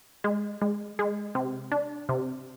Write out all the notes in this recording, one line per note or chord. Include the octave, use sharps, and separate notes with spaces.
G#3
G#3
G#3
C3
D4
C3